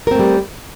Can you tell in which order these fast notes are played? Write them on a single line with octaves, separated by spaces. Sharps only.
A#4 C4 A3 G3